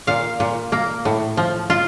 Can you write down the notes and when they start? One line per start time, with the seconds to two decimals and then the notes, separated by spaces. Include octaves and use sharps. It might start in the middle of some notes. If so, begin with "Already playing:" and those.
0.07 A#2 F5
0.40 A#2
0.72 A#3
1.05 A2
1.37 F3
1.70 F4